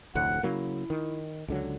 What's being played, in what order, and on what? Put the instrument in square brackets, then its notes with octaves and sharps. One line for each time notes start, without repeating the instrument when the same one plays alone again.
[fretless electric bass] F1 D2 A2 [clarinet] F#5
[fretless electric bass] C#3 F#3 A#3 [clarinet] E4
[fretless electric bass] D#3
C#2 D3 F#3